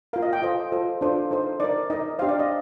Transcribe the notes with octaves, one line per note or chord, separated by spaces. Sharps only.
F4 A#4 F5
D#5
G5
F4 A4 C5 D#5
F4 A4 C5
D4 F4 A4 C5
D#4 A4 C5
D#4 A#4 D5
D#4 A#4 D#5
D4 G4 C5 F5
D5
D#5